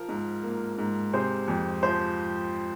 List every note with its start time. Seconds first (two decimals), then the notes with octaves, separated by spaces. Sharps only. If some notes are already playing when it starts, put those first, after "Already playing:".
Already playing: F3 A#4
0.09 G#2
0.43 A#3
0.78 G#2
1.13 C3 G#4 C5
1.48 F2
1.83 F3 G#4 C5